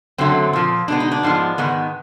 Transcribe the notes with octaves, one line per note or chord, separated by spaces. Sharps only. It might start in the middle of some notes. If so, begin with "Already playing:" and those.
F#2 D3 F#3 A3 C4
A#2 F3 A#3
B2 G#3 B3 D4
D#4
D4
G#2 F3 G#3 B3
G#2 D#3 G#3 B3